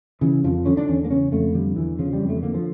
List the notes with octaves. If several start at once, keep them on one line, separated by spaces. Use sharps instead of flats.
C#3 E3
F2 F3
D3 C#4
D4
E2 C#4
A#3
C#3 C#4
F2 A3
D3 G3
E2 E3
C#3 F3
G3
F2
A3
D3 A#3
F3